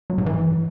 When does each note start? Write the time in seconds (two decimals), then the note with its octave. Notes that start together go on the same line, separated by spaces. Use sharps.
0.10 F#3
0.18 G#2
0.26 E3